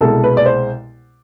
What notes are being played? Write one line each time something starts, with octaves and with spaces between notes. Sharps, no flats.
C2 B2 G#3 A4
B4
D5
C5